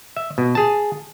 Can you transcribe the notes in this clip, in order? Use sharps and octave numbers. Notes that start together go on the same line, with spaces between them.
E5
B2
G#4 A5